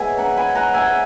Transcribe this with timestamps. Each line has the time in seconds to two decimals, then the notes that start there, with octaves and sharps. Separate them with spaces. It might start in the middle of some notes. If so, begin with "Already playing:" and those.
Already playing: G#2 F#3 B3 E5 G#5
0.18 F#5 A#5
0.37 G#5 B5
0.55 F#5 A#5
0.74 E5 G#5
0.87 E5